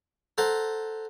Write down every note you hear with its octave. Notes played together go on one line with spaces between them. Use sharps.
A4 C5 F#5 A#5